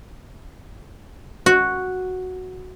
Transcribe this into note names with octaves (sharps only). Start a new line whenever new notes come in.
F#4